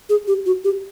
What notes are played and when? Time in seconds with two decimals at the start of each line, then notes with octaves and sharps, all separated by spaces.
0.09 G#4
0.28 G4
0.46 F#4
0.65 G4